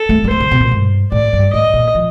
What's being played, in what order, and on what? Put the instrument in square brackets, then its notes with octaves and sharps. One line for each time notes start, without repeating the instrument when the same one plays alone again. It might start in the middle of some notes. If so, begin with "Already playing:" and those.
Already playing: [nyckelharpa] A4
[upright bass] A3
G3
[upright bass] A3 [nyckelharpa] C5
[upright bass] D3
C3
A#2
G2
[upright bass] A2 [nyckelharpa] D5
[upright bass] G2
[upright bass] A2 [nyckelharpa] D#5
[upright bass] A#2
F3